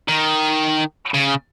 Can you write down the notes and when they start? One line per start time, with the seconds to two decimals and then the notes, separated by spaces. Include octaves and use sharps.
0.08 D#3
1.14 C#3